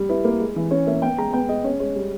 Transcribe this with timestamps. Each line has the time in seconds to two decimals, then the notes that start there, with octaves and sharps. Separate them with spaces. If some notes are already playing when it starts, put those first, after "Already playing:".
Already playing: G3
0.09 E4 B4
0.25 A#3
0.40 G#3
0.56 E3
0.71 C#4 C#5
0.87 A#3 E5
1.02 B3 G5
1.18 G#3 A#5
1.33 B3 G5
1.49 G#3 D#5
1.64 C#4 C#5
1.80 G#3 C#5
1.96 G3